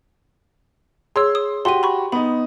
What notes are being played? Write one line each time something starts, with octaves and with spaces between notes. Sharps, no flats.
G#4 C#5 C6 E6
D#6
F#4 G4 C6 D#7
B5 C#6
B3 D#4 B5